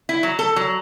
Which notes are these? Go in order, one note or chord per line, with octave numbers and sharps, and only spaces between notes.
E4
F#3
A4
F#3